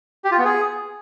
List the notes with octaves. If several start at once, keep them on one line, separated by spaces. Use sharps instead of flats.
G4
F4
B3
G#4